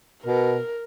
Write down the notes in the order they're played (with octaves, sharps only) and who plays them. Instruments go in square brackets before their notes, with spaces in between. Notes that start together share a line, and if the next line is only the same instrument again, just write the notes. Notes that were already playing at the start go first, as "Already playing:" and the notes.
[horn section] B2 [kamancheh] A#4